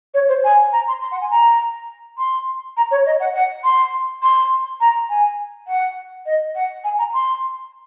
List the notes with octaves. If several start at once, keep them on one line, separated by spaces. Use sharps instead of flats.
C#5
C5
G#5
A#5
C6
C6
F#5
G#5
A#5
C6
A#5
C#5
D#5
F#5
F#5
C6
C6
A#5
G#5
F#5
D#5
F#5
G#5
A#5
C6